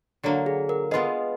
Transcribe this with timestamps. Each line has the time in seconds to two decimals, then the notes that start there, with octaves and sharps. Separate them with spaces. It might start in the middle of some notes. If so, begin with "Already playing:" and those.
0.23 D3 F#3 A#3
0.46 G#4
0.69 A#4
0.91 G#3 B3 F4 G#4 B4 D#5